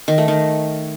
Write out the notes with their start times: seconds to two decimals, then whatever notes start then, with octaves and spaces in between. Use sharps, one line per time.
0.08 D#3
0.18 A3
0.28 D#3